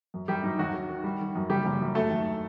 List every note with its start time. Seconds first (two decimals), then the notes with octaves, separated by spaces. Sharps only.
0.14 F#2
0.28 F#2 G3 G4
0.43 F#2 D#4
0.58 D#2 F#3 F#4
0.73 F#3
0.89 D#3
1.04 G3
1.20 D#3
1.35 F#2
1.49 F#1 G3 G4
1.65 F#1
1.81 F#2
1.95 F#3 A3 A4
2.10 D#2